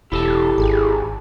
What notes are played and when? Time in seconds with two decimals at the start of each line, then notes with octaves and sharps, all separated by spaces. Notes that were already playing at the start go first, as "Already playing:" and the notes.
0.12 E1 E4 G4 A4 A5
0.58 G#1 G#4